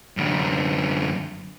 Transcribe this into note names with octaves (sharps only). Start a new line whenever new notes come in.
F#2 D3